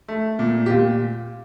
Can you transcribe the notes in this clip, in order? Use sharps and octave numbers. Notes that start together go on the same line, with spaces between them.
A3
A#2
G4
A#2 F4